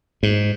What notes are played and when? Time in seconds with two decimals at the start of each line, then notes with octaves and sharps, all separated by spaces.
0.23 G#2